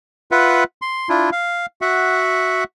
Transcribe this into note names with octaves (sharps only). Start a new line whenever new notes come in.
F4 B4 E5 F#5
C6
D4 E4 F4
F5
F#4 E5 F#5